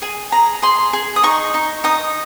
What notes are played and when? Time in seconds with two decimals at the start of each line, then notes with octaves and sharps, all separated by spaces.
0.02 G#4 G#5
0.32 G#4 A#5
0.62 G#4 C6
0.93 G#4
1.16 D#6
1.23 D#4 C#6
1.54 D#4
1.84 D#4 D#6